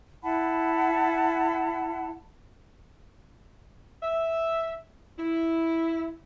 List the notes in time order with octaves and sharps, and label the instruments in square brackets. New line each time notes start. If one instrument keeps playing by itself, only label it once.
[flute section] E4 F#5 A5 B5
[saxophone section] E5
E4